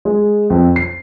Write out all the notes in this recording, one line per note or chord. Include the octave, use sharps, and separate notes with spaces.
G#3
F2
C7